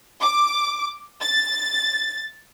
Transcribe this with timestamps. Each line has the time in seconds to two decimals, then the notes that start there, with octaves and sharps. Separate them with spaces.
0.21 D6
1.21 A6